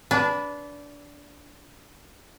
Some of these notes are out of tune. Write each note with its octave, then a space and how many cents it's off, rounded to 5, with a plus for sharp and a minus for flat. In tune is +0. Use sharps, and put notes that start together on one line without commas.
D4 -20 B4 +0